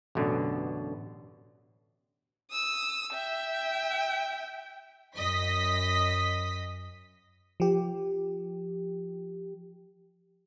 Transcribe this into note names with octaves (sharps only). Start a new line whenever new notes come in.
A1 F#2 B2 D3
D#6 E6
E5 G5
F#2 D#5 B6
F3 G4